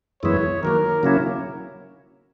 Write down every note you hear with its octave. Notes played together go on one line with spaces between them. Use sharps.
F#2 E3 G#3 B3 E4 C#5
D#3 F#3 A#3 A#4
C#3 F#3 A#3 C#4 E4